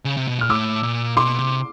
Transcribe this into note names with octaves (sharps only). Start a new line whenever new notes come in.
C#3
C3
B2
A#2 F6
A2 D6 E6
A#2
B2 C6 D6
C3